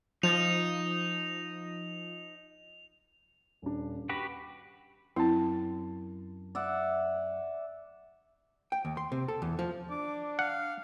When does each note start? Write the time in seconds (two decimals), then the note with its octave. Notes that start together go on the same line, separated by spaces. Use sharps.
0.23 F3 D#4 F7
3.62 D#1 C#4 D4
4.09 F#4 G4 B4 B5 A#6
5.16 F#2 C4 E4 A5
6.55 D5 E5 F#5
8.72 G5
8.85 D#2
8.97 C6
9.12 C3
9.28 A4
9.42 E2
9.59 F3
9.90 D4 D6
10.39 F5 F#5